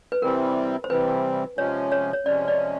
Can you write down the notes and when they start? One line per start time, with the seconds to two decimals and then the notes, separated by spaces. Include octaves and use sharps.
0.12 B4
0.22 C3 E3 G3 C4 A#4
0.84 C5
0.90 C3 E3 G3 C4 B4
1.58 C3 F3 G#3 C#4 C#5
1.92 C#5
2.13 C#5
2.25 C3 F3 G#3 C#4 D5
2.48 D5